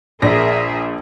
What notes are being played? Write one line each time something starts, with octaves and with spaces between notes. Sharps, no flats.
A#1 G#4 A#4 D5 E5 A#6